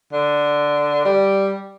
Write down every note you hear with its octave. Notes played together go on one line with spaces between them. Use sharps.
D3
G3